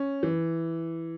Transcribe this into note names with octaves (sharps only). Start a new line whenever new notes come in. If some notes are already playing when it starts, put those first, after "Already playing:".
Already playing: C#4
E3